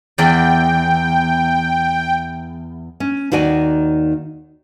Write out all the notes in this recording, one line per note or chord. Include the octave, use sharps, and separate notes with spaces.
E2 D5 G5
C#4
D#2 D#3 F#4 D5 G#5